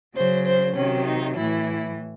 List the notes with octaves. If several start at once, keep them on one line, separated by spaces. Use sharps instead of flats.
C#3 F#3 C5
C5
C3 D#3 F#3 C#4
D#4
A2 E3 E4